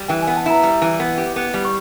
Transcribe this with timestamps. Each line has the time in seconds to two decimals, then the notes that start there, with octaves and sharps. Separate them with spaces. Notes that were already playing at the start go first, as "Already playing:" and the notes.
Already playing: G3
0.08 E3 G5
0.22 G#5
0.27 B3
0.36 A5
0.46 E4 A#5
0.63 G3
0.82 E3
1.00 B3
1.18 G4
1.36 B3
1.54 G3
1.65 C#6